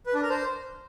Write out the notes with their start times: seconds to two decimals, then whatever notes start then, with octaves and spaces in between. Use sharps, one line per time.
0.06 B4
0.14 D4
0.22 A#4
0.30 C5